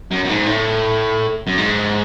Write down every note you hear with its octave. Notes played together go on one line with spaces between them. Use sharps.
F#2
F#2
G#2
A2
F#2
G#2